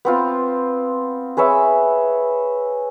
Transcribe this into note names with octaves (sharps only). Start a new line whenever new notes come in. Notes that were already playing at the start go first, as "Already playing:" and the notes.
B3 C4 F4
G#4 B4 C#5 E5